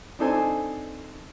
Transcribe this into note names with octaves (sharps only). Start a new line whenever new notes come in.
C4 D4 D#4 A4 C5 G#5